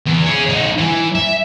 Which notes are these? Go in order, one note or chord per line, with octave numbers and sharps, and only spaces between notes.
E2 E3
G#4 C#5
D#4 F#4
E3
E5